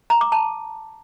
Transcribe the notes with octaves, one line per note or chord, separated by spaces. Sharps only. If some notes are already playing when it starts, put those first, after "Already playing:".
A#5
D6
A5